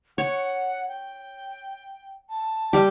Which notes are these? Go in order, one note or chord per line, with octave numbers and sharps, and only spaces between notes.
C#5 F#5
G5
A5
G3 G4